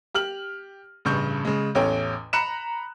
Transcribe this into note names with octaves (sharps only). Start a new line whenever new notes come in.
G4 F6 F#7
A1 G2 C#3 C#6 G6
C#3 G#3
A1 E2 C#4 A4 C#5 G5
A#5 B5 F#6 C#7 E7